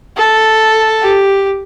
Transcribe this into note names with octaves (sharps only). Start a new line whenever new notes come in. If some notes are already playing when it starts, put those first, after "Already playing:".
A4
G4